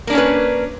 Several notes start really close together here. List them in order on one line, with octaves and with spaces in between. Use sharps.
A#3 D4 C#4 C#5 B4